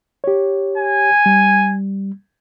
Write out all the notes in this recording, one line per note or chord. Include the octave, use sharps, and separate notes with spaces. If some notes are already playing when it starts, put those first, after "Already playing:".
G4 C#5
G#5
G3